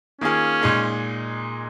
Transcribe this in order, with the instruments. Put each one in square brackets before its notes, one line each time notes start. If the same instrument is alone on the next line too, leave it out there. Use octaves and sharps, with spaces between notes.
[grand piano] D#3 A#3 F4 G#4 [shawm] C#4
[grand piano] A#2 G#3 D#4 G#4